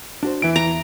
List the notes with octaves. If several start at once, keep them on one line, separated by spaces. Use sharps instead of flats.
D4 F#4 C5
E2 E3 E5 D7
A#5